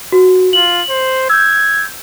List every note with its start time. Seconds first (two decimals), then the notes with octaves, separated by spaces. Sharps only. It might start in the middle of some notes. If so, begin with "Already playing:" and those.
0.12 F#4
0.53 F4 F#7
0.90 C5
1.30 E6 G6 G#6